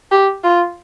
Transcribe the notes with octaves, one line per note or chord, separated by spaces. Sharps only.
G4
F4